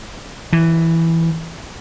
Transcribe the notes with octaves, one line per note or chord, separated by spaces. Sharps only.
E3